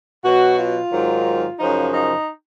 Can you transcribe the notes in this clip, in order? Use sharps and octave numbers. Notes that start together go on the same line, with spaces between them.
B2 F#3 F#4
F4
G#2 D#3 F#3
F#2 C#3 F3 D#4
D#4